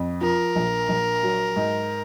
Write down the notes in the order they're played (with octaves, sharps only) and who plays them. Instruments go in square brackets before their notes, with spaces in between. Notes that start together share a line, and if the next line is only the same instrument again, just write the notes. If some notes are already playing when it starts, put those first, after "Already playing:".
Already playing: [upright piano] F2
[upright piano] F3 [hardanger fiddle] A#4
[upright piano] A#1
A#1
F#3
G#2